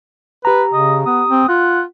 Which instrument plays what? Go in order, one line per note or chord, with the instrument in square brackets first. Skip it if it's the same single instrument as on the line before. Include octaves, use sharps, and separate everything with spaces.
[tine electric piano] G4 A#5 [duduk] B4
[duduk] C#3 [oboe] D#5
[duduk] B3 [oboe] D#6
[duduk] C4
[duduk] F4 [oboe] F#5